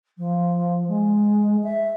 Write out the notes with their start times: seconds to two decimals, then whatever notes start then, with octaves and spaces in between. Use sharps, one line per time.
0.17 F3
0.88 G#3
1.63 E5